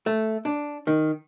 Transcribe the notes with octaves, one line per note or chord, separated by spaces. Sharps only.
A3
D4
D#3